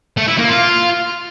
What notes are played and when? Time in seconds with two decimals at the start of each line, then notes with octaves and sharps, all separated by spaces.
0.17 A3
0.27 E4
0.38 A#3
0.48 F4